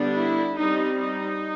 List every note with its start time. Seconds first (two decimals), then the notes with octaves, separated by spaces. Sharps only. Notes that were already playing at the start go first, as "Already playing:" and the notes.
Already playing: D3 G3 B3 D4
0.13 E4
0.57 G3 C4 D#4
1.00 D#4